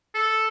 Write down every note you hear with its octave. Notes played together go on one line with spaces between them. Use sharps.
A4